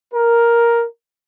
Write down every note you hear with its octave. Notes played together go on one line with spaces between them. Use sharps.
A#4